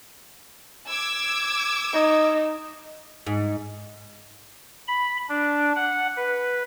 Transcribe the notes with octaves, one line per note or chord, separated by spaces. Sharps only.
D6 E6 G#6
D#4
G#2
B5
D4
F#5
B4